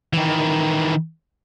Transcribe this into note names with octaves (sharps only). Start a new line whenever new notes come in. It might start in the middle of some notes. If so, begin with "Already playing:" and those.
D#3 E3